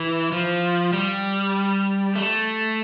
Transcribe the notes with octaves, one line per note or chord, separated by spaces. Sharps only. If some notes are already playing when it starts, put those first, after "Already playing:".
Already playing: E3
F3
G3
A3